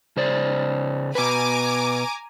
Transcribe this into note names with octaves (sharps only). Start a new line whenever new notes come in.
C#3 C5 D5
B2 B4 G#5 A#5 D6